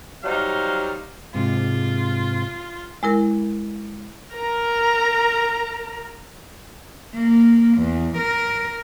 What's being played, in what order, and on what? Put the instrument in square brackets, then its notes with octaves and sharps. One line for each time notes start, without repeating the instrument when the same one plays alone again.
[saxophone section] F#3 G3 D#4 C5 F5
[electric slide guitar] G#2 C3 G#3 [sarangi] F4
[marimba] G#3 E4 A#4
[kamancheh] A#4 A#5
[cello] A#3
E2
A#4